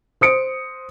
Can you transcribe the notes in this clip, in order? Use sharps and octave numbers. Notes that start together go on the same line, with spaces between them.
C5 D#6 C#7 D7